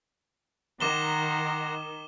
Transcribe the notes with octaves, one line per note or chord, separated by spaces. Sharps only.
D#3 F#5 A#5 C6 D6 E7 G7